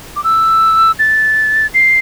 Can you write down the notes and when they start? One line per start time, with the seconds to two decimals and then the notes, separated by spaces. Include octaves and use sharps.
0.16 D6
0.24 E6
0.99 A6
1.74 C7